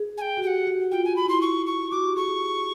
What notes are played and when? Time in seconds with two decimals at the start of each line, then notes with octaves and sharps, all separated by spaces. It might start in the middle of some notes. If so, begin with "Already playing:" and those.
Already playing: G#4
0.18 G#5
0.21 G5
0.37 F#4
0.42 G4 G5
0.47 F#5
0.67 F#4
0.91 F4 G5
1.05 F#4 G#5
1.16 B5
1.25 E4 C6
1.41 C#6
1.66 C#6
1.91 F#4 D6
2.04 G4
2.16 G#4 C#6
2.28 G#4